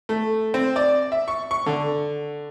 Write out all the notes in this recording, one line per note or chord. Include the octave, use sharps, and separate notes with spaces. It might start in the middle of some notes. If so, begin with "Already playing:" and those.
A3
C4
D5
E5
C#6
C#6
D3